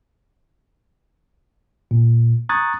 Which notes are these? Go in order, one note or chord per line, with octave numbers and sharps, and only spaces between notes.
A#2
A#5 C#6 D#6 F#6 G#6 A6